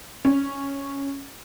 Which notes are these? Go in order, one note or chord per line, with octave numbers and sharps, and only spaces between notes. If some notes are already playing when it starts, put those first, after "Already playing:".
C#4